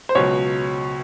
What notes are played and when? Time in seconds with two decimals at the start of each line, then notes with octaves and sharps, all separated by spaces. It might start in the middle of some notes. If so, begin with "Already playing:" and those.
0.09 C5
0.15 C#2 B2 F#3 C#5